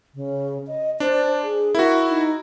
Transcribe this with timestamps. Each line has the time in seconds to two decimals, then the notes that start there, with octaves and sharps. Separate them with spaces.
0.15 C#3
0.67 D#5
1.00 D4 C5
1.43 G#4
1.75 E4 F#4 A#4
2.09 D#4